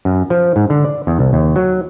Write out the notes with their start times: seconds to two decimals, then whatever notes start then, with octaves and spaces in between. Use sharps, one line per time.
0.05 F#2
0.30 F3
0.56 G#2
0.70 D3
0.85 D5
1.07 E2
1.19 C2
1.33 D#2
1.56 F#3